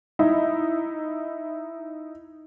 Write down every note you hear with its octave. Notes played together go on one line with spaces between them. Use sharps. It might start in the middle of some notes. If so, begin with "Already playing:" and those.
D#4 E4